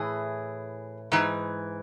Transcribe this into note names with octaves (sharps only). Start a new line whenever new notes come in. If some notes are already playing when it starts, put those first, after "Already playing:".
Already playing: A2 E3 G#4
G#2 E3